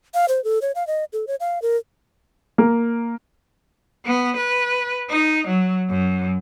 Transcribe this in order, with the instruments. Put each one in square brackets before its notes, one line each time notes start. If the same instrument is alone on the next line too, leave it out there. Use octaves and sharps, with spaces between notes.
[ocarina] F5
C5
A4
C#5
F5
D#5
A4
C#5
F5
A#4
[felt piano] A#3
[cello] B3
B4
D#4
F#3
F#2